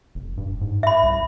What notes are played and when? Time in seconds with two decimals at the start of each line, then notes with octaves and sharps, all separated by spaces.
0.15 F1
0.37 G2
0.61 G#2
0.83 E5 B5
1.03 C2